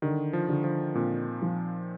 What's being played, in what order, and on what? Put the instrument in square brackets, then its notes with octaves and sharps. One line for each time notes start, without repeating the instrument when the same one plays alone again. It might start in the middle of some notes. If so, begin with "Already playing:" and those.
[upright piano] D3 [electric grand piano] D#3
[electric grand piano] F3
[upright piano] D3
[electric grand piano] F3
[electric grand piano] A#2 [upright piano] C4
[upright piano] F3